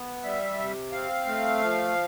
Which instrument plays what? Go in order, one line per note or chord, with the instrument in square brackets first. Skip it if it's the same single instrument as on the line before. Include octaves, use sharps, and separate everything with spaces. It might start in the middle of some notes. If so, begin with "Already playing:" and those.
Already playing: [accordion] B3
G3 E5
C3
C4 F5
A3
F3